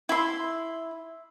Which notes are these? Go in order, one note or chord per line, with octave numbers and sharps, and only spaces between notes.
E4 C6